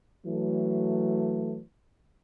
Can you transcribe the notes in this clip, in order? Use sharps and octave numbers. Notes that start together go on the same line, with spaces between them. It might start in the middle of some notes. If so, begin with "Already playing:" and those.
E3 F#3 A3